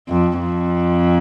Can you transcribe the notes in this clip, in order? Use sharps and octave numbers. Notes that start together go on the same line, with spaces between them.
F2
F2